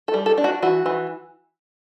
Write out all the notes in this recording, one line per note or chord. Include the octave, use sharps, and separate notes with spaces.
A4
G3
A4
D4
F#4
E3 F#4
E3